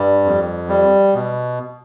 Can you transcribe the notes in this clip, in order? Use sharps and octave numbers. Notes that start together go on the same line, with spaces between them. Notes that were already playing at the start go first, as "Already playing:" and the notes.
Already playing: G2 G3
F2
G3
B2